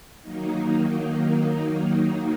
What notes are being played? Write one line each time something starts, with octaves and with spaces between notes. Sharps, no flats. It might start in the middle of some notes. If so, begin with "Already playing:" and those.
D#3 F#3 A#3 D#4